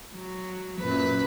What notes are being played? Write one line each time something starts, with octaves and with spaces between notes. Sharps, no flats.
F#3
F#2 A#2 B4